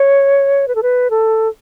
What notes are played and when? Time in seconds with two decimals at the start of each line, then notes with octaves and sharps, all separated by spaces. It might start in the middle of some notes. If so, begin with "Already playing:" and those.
Already playing: C#5
0.68 B4
0.75 A4
0.83 B4
1.10 A4